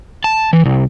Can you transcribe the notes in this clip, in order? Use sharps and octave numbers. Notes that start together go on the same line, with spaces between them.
A5
E3
C2